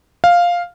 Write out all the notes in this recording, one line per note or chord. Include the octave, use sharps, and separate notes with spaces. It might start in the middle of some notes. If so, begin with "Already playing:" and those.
F5